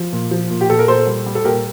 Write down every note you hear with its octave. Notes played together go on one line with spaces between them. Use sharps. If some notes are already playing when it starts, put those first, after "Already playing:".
Already playing: F3
A#2
F3
A#2
G4
A#2 A4
A#4
A#2 A4 C5
G3
G3
A4
A#2 G4 A#4